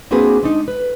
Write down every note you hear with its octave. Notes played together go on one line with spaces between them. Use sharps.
A#3 C4 D4 F#4 G#4 B4
G#3 D4 D#4
B4